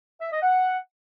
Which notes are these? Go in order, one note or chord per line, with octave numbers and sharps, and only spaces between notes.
E5
D#5
F#5